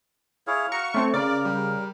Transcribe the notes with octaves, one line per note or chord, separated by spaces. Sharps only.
E4 G#4 C#5 F5
F#4 A#4 C#6
A3 C4 C#5
C#3 A#4 D5 F5
G3